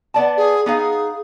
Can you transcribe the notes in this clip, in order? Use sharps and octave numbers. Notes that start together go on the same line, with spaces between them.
B3 D5 A5
G#4
B3 D#4 G#4 F5